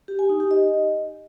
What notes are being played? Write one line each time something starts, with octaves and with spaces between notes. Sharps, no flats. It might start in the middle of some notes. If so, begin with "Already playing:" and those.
G4
G#5
D#4
G4
D#5